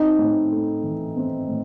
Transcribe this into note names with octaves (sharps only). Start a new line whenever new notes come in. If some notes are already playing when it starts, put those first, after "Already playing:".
Already playing: C4 D#4
A2
A3
E3
C4
A2